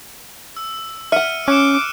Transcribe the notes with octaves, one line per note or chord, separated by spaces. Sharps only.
E6
E5 F#5 F6 C#7 D#7
C#4 D6 F#6 C#7 E7